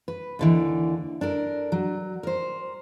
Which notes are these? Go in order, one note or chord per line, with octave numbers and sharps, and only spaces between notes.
B4
D#2 D3 E3
D4 A4 A#4
F#3
A#4 C5